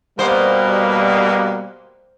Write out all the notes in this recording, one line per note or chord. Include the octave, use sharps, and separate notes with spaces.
B2 G3 A#3 B3 C5